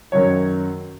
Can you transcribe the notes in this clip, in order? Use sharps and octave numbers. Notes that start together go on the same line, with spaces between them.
F#2 D#3 F#3 C#5